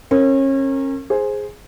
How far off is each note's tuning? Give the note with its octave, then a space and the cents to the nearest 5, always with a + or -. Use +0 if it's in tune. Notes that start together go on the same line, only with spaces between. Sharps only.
C#4 -35 A#4 -25
G#4 +0 C5 +5